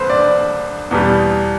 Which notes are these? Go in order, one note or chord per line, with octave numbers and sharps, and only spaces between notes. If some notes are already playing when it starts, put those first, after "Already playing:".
Already playing: C2 A4 B4 C5
D5
E2 B2 G3